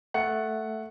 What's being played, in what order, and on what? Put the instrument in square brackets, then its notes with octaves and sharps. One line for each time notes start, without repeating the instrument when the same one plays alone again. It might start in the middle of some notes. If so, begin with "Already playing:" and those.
[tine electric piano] A3 [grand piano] F#5 C#7